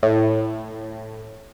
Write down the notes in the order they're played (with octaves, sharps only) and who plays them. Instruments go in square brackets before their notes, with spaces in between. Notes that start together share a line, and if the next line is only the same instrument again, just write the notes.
[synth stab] A2